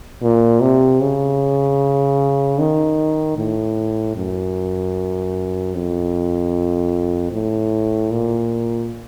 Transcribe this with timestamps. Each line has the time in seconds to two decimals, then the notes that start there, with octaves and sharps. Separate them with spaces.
0.23 A#2
0.62 C3
1.02 C#3
2.59 D#3
3.37 A2
4.16 F#2
5.75 F2
7.32 A2
8.11 A#2